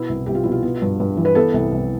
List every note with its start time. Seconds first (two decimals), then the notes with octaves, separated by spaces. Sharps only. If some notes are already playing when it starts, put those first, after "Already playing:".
Already playing: B2 B3 E4
0.09 C2
0.26 C2 G4
0.35 F4
0.44 B2 E4
0.52 F4
0.63 B3
0.82 G2
1.00 G2
1.17 E3
1.25 B4
1.35 B3 A4
1.54 C2
1.72 C2